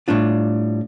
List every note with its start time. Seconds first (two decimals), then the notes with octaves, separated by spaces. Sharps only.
0.08 A2 G3 D4 F4